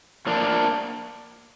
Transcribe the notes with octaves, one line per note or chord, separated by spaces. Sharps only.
A2 F3 A#3 D4